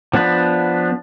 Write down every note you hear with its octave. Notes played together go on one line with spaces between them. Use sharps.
F3 B3 D4 B4